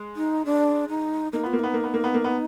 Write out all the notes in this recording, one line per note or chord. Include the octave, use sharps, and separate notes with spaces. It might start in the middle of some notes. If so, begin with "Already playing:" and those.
Already playing: G#3
D#4
D4
D#4
A#3 D#4
B3 F4
A#3
B3 D#4
A#3
B3
A#3
B3
A#3
B3